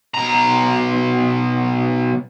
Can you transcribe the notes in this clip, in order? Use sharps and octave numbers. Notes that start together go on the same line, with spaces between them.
B1 A#5